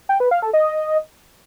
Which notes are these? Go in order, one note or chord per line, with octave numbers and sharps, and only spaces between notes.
G5
B4
F5
A4
D#5